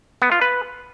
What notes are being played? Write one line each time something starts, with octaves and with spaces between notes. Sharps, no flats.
B3
F4
B4